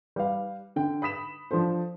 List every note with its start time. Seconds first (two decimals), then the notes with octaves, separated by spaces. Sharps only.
0.16 G3 B4 F5
0.76 D3 G5
1.02 B5 D#6 B6 E7
1.51 F3 D4 A4 C5